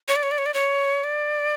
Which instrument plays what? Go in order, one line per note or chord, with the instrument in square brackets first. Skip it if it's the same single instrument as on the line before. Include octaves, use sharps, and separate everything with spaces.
[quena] C#5
D5
C#5
D5
C#5
D5
C#5
D5